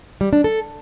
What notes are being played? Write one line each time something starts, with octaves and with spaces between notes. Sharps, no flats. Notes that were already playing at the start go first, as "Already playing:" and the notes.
G3
D4
A4